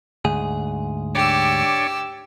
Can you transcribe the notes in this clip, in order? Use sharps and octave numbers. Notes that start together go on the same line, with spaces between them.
D2 G#2 G#4
D4 G4 C#5 D5 E6